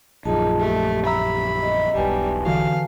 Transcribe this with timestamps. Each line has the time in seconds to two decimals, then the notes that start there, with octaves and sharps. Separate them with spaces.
0.25 A#1 F#2 D#4 F4 G#4 A5
0.60 A3 G4
1.06 E5 A#5 B5 E6
1.62 D#5
1.95 E1 B1 G3 B4 G#5 A5
2.46 D3 E3 F#4 F5